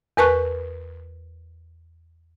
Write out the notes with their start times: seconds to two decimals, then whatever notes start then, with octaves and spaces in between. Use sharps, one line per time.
0.17 E2 A#4 B4 A5 C#6 F#6